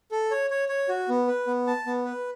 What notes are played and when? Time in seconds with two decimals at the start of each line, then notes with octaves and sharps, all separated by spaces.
0.12 A4
0.31 C#5
0.50 C#5
0.69 C#5
0.89 F#4
1.09 B3
1.27 B4
1.47 B3
1.67 A5
1.86 B3
2.05 B4